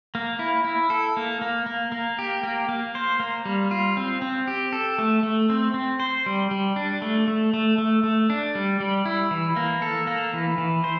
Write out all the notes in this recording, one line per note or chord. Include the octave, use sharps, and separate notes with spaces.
A#3
E4
E4
A4
A#3
A#3
A#3
A#3
G4
A#3
A#3
C5
A#3
G3
F4
C4
C4
G4
A4
A3
A3
C4
C4
C5
G3
G3
D4
A3
A3
A3
A3
A3
D4
G3
G3
E4
E3
A#3
A4
A#3
E3
E3
C5